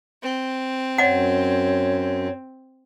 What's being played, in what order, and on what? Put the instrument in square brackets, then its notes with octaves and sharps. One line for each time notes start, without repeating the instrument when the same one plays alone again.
[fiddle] C4
[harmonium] F#2 [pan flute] C#5 [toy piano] D#5 F#5